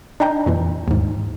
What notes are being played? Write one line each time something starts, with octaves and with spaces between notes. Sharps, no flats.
D4 D#4 G5 A#5
F2 A#2 E3
D#2 G#2